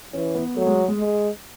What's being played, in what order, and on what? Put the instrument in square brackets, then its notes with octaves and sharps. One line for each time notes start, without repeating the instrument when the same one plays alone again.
[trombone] E3 [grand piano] C#4
[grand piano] B3
[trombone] F#3 [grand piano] A3
[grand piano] G#3
G#3
[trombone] G#3